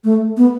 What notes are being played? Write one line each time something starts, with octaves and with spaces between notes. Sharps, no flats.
A3
B3